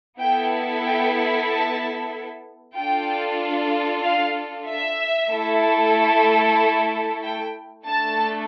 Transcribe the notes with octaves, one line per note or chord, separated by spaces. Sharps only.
B3 E4 A4 G5
G5
A5
D4 F4 A4 G5
F5
E5
A3 E4 A4
G5
A3 D4 A4 A5